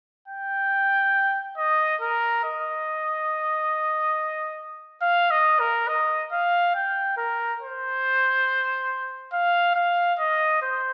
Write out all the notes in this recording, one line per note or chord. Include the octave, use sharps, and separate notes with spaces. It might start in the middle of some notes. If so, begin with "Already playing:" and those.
G5
D#5
A#4
D#5
F5
D#5
A#4
D#5
F5
G5
A#4
C5
F5
F5
D#5
C5